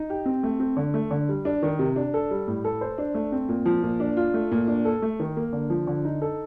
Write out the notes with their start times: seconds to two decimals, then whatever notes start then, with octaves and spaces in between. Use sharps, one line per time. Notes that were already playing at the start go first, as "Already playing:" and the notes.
Already playing: D#4
0.10 G4
0.26 C4
0.43 A3
0.60 C4
0.77 D3
0.94 A3
1.11 D3
1.29 G3
1.45 D4
1.63 D#3
1.79 C3
1.96 D4
2.14 A4
2.31 G3
2.48 A2
2.64 A4
2.81 C5
2.98 D4
3.15 A3
3.32 C4
3.49 A#2
3.66 F3
3.83 A#2
4.00 D4
4.17 F4
4.34 A3
4.52 A#2
4.68 D4
4.85 A4
5.02 A3
5.20 D#3
5.37 A#3
5.53 D3
5.70 F3
5.87 D3
6.05 D#4
6.22 A4